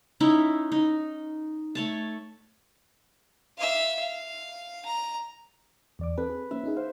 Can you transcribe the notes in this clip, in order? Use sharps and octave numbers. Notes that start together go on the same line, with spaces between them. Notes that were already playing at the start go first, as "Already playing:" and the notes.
C#4 D#4 E4
D#4
A3 C#5 A5
E5 F5
F5
A#5
E2 D5 D6
C4 A4 B4
G#4
A#3 C#4 E5
C#4 D#4 G#4
C5 F5